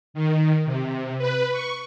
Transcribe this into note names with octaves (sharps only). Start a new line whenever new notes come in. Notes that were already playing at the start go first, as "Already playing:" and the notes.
D#3
C3
B4
C#6